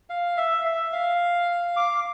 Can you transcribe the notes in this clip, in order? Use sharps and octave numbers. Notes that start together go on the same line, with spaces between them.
F5
E5
E5
F5
D6